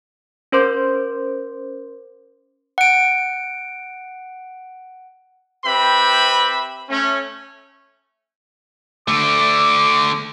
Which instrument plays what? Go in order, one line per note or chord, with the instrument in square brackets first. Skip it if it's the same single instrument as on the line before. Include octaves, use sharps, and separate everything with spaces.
[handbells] C#4 A#4 C5 C6 D6 G6
F#5 D7
[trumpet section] C4 G4 B4 E5 B5
A3 C#4
[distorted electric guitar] D3 A3 [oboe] D6